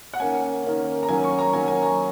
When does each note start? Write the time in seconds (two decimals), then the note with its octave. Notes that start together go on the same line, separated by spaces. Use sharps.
0.14 F#5
0.20 D#3 A#3 C#4 G#5
0.64 D#3 A#3 C#4
1.03 A#5
1.09 D#3 F#3 A#3 C#4 G#5
1.24 C#6
1.39 A#5
1.53 D#3 F#3 A#3 C#4 G#5
1.68 G#5
1.82 A#5